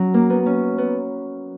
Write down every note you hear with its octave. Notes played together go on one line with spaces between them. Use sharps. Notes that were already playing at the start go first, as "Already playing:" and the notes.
Already playing: F#3 C#4
A#3
B3
C#4
B3